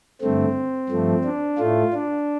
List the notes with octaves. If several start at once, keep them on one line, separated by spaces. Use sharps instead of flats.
G2 D3 A3 C4
G2 F3 A3
D4
A2 A3 F4
D4